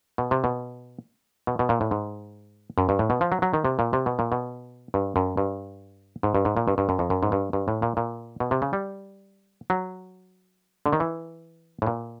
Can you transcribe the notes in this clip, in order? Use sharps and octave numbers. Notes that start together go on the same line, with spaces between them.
B2
C3
B2
B2
B2
A#2
A2
G#2
F#2
G2
A2
B2
F3
F#3
F#3
D#3
C3
A#2
C3
B2
A#2
B2
G2
F#2
G2
G#2
G2
G#2
A#2
G2
G2
F#2
F2
F#2
G#2
G2
G2
A2
A#2
A#2
B2
C3
C#3
G3
F#3
D3
D#3
E3
A2
A#2